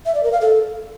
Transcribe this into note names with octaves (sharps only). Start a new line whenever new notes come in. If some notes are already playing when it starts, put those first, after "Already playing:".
E5
D5
A#4
F5
A4